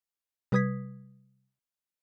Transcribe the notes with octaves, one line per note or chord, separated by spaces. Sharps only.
C3 G3 B4 D#6 G#6 B6